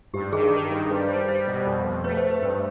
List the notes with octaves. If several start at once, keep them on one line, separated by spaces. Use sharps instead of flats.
G2 G4
D#3 G#4
A#4
D#3
G2
G3 B4
G3 C5
G3 C5
B2
F2
F2
A3 B4 C#5
C5
A3
B4
G2 B4